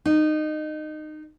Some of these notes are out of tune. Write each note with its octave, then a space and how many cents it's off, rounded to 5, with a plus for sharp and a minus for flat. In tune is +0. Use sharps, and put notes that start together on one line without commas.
D#4 -20